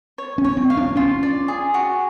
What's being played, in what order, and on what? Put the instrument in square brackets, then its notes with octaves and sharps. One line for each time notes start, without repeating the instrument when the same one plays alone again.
[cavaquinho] C#5
[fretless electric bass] C#4
[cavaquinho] C#5
[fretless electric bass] C4
[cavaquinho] F5
[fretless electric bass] D4
[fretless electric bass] C#4 [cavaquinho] F4
[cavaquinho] D5
G#4
F#4